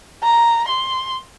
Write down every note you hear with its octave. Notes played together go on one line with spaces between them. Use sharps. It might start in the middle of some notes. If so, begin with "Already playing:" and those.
A#5
C6